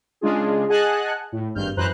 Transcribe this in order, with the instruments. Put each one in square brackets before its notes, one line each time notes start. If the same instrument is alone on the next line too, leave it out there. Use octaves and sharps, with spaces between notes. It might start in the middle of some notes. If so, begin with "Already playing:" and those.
[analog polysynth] C#3 G#3 D4 F4 G#4
G#4 D#5 F#5 G#5 A5 F#6
A2
G#1 G2 F6 G6
F#2 E3 B4 C5 A#5 F#6